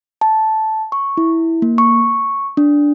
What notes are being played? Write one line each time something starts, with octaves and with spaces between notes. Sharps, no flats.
A5
C#6
E4
A#3
C#6
D4